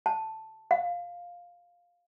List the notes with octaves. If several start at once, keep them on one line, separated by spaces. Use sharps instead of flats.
A5
F5